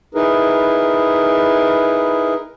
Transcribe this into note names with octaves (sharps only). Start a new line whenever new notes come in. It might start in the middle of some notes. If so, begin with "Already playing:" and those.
D#4 E4 G#4 A#4 B4